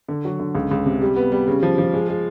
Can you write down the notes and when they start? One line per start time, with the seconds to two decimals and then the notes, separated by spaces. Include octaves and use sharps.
0.08 D3
0.25 F#3
0.39 D3
0.55 C#2
0.71 C#2
0.86 C3
1.02 G3
1.16 B3
1.32 G3
1.48 C#3
1.63 F3
1.78 F3
1.94 G#3
2.09 G#3